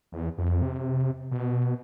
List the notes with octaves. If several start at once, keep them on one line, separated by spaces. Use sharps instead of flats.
E2
F2
C3
B2